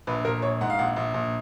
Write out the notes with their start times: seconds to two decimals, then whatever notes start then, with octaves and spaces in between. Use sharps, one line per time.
0.07 A#1 B4
0.25 A#1 A#4
0.42 A#1 C#5
0.61 G#2 F#5
0.70 F5
0.79 A#1 F#5
0.96 A#1
1.14 A#1